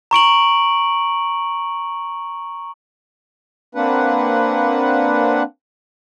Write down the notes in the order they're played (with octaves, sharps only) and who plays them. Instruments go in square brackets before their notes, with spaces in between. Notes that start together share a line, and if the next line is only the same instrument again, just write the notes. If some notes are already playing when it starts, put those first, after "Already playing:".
[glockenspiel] A#5 C#6 D7 F#7
[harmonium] A#3 C4 D4 B4 F#5